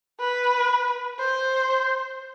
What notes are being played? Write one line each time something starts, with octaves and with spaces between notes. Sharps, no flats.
B4
C5